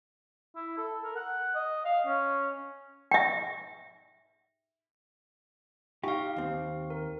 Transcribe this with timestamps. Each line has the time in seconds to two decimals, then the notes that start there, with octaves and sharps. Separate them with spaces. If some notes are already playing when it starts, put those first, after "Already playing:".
0.56 E4
0.78 A4
1.03 A#4
1.16 F#5
1.55 D#5
1.85 F5
2.06 C#4
3.11 E5 G5
6.03 D#4 G4 F5 C#6
6.36 D#2 C4
6.90 A#4